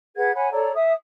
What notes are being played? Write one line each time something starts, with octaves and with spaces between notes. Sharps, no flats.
G#4 B4 F#5 G#6
C#5 F#5 G#5 B5
A4 C#5 D5 A#5
E5 D#6